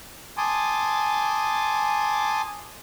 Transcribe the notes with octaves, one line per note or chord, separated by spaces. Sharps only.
G#5 A5 C6 D6 D#6